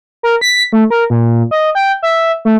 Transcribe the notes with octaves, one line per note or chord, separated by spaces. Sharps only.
A#4
B6
A3
A#4
A#2
D#5
G5
E5
A3